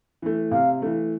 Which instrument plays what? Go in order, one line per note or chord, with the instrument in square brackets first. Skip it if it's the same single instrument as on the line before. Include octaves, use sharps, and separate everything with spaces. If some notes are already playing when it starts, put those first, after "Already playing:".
[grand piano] E3 A3
[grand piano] C3 [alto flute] F5
[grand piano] E3 A3